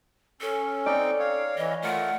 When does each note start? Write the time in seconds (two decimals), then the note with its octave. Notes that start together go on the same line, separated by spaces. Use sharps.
0.41 C#4 A4
0.86 C4 D#4 D5 G5
1.19 C#5 F5
1.58 E3 D#5
1.84 A3 F4 A#4 F#5